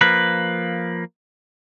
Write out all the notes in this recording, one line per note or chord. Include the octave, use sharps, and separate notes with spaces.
F3 A#3 B4